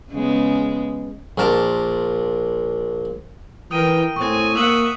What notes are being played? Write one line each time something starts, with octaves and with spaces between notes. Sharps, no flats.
C#3 G#3 B3
A#1 A#2 A#4 A5
E3 A#4 G5 D#6 D#7
A2 C4 G#5 C#6
A#3 E5 F#5 D#6 E6 F#7